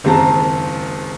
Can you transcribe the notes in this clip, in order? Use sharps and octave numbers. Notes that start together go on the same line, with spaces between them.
F#1 D#2 G#3 C4 A5 A#5